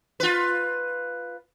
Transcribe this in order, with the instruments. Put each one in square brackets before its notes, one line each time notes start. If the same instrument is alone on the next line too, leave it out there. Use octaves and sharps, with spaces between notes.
[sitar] F4 B4